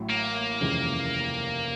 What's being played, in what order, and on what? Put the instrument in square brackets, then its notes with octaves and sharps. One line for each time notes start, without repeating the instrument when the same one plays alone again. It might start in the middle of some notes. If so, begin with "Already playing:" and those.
Already playing: [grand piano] A1 A2 F#3
[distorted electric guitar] A#3
[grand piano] F1 D#2 C#3 E3 G#3